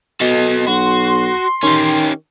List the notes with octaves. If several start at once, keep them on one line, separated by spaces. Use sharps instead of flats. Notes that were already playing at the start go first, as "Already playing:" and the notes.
B2 A4 D#5
B1 F#4 C6
D#3 C#4 G4